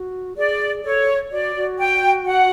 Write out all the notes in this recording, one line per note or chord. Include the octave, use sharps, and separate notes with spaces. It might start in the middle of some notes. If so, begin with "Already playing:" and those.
Already playing: F#4
G#4 D5
A4 C#5
F#4 D5
F#4
G5
F#5